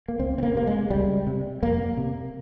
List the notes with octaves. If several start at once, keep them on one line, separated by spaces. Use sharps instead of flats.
A#3
C#2 C4
C4
A#3
C3 A#3
G#3
C#2 G3
C3
F2 A#3
C3